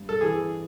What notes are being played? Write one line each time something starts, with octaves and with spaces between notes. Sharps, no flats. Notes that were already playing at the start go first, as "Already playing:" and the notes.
Already playing: G2
A4
E3 G#4